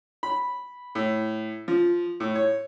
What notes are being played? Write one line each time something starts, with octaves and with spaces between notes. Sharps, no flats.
B5
A2
F3
A2
C#5